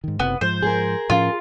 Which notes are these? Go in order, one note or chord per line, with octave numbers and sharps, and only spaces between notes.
G#2 D#3
F#1 C3 B3
G#2 F3 C5
G#4 A#4
A2 F3 C#4 F4